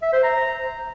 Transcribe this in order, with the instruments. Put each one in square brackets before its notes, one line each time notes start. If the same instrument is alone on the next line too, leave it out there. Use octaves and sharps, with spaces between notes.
[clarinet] E5
C5
A#5